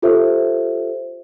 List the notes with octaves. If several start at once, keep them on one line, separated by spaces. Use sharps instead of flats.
F4 G4 A4 C5 E5